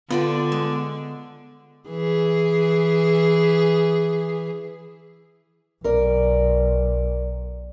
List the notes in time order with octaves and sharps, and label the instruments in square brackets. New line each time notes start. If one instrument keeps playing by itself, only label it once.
[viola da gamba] D3 [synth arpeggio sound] B3 [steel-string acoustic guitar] F4 D5 G5
[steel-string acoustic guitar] G#3
[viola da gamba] E3 G#4
[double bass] B1 [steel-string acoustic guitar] A#4 D5